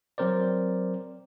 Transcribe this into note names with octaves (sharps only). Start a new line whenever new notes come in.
F#3 C4 A#4 C5 D5